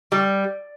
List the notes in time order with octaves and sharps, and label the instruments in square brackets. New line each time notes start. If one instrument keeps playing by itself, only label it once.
[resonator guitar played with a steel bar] G3